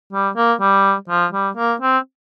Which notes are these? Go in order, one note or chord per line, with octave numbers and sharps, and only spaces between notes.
G3
A#3
G3
F3
G3
A#3
C4